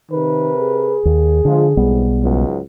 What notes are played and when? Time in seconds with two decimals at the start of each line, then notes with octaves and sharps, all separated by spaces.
0.11 C3 D#3 A#4 B4
0.60 G#4
1.05 D#2
1.45 D3 F3 G#3 F4
1.77 B1 F2 G#2 G3 B3
2.21 C#2 G#2 F#3